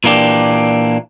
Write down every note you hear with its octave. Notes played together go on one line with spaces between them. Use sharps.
A#2 E3 A#3 D4 G4